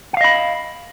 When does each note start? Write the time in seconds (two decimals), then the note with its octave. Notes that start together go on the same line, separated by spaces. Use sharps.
0.13 F#5
0.17 F5
0.21 D#5
0.24 B5